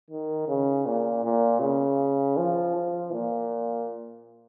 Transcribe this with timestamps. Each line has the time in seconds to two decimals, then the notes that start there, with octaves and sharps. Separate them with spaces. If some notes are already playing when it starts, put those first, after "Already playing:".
0.10 D#3
0.48 C#3
0.86 A#2
1.24 A#2
1.61 C#3
2.37 F3
2.75 F3
3.12 A#2